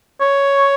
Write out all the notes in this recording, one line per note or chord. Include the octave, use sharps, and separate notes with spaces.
C#5